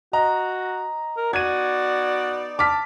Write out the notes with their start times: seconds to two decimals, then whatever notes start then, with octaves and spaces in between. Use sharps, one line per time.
0.13 F#4 D#5 A#5
1.17 A#4
1.33 B3 D#4 F#4 D5 G#6 D#7
2.59 A5 D6 F6 B6